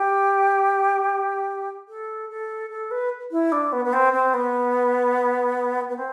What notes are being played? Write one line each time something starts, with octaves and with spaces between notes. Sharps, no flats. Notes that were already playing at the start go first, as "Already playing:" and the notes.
Already playing: G4
A4
A4
A4
B4
E4
D4
B3
B3
C4
C4
B3
B3
C4